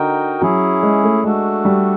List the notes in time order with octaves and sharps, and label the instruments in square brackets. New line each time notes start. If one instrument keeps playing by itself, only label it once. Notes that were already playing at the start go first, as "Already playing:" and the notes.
Already playing: [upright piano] D3 [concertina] D#4 F#4 A#4 D#5 G5
[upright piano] F#3 [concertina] C#4 E4 G#4
[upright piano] G#3
A3
[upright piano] G#3 [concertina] A3 D4 F#4 A4
[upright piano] G3